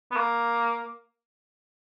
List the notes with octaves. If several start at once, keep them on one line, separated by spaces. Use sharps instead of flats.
B3
A#3